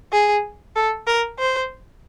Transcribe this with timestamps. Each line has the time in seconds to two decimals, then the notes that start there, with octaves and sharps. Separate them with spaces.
0.12 G#4
0.75 A4
1.07 A#4
1.39 C5